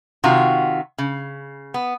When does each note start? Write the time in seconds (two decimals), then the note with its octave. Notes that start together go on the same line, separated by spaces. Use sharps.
0.24 C3 D#3 F4 F#4
0.98 C#3
1.74 B3